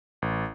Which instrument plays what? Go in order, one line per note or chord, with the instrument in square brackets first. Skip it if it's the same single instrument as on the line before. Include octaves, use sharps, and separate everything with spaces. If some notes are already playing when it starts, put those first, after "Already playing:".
[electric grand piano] A1